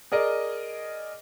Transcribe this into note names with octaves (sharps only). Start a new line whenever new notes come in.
G#4 A#4 D5 D#5